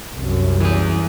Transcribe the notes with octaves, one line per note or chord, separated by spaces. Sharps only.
C2 F#2
E3 G#4